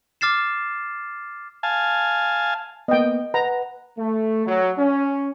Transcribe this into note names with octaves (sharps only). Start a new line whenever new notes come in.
D6 F6 A6 C7 E7
F5 G#5 A5
A#3 B3 D#5 G5
B4 F#5 A#5
A3
F#3
C#4